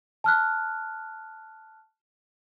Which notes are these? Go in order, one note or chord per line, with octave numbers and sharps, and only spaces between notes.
A5 F6 F#6